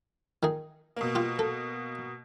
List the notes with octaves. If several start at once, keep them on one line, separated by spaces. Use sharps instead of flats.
D#3 G#4
B2 A#3
F4 G4
A4